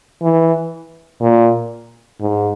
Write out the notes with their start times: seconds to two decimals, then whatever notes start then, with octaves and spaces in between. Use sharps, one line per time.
0.22 E3
1.21 A#2
2.20 G#2